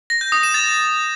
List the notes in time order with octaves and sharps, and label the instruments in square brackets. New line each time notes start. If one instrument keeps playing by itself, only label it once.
[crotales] A#6
G6
D#6
E7
A6